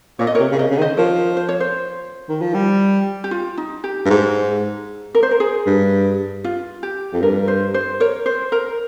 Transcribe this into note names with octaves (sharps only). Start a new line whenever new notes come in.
A#2 C#5
D#5
C3 A#4 C#5
C#3
C3 D#5
C#3
D#3
C5 D#5
F3 A#4 C#5
C5
C#5
C5
D#3
F3
G3
G4
F4
D#4
G4
G2
G#2
A#4
C5
A#4
G#4
G2
F4
G4
F2
G2 A#4
C5
C5
A#4 C#5
C5
A#4